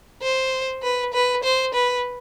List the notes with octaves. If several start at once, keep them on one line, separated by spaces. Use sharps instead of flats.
C5
B4
B4
C5
B4